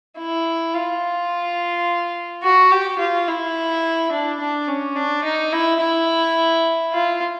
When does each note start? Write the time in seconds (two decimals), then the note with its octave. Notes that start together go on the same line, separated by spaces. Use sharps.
0.18 E4
0.74 F4
2.43 F#4
2.71 G4
2.99 F4
3.27 E4
4.12 D4
4.40 D4
4.68 C#4
4.96 D4
5.24 D#4
5.53 E4
5.81 E4
6.93 F4